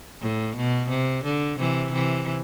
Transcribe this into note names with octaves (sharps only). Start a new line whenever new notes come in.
A2
B2
C3
D3
C3 E3
C3 E3